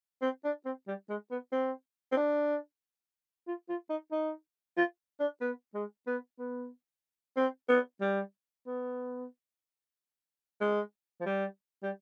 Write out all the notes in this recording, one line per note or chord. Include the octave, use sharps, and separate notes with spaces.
C4
D4
C4
G3
G#3
B3
C4
C4
D4
F4
F4
D#4
D#4
F4
D4
B3
G#3
B3
B3
C4
B3
G3
B3
G#3
F3
G3
G3